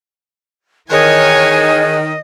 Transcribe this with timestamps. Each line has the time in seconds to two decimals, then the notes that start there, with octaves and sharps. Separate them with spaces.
0.91 D#3 E3 G#4 C#5 D#5 G#5 F#6